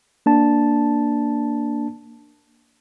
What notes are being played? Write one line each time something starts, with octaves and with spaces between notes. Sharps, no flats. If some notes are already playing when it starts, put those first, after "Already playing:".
A#3 D4 A5